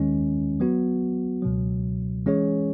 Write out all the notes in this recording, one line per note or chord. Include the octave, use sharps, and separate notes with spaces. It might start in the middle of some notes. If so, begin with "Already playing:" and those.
Already playing: D#2 D#3 G#3 C#4
F#3 B3 F#4
C#2 B2 F#3
E3 G#3 C#4 G#4 C#5